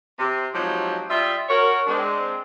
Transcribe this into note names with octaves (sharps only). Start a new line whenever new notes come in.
C3
F3 F#3 G#3 C4 D#4 G4
G3 F4 D#5 E5
F#4 A#4 C#5
G#3 C4 D4